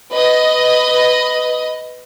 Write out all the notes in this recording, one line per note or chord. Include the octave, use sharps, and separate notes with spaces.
B4 D#5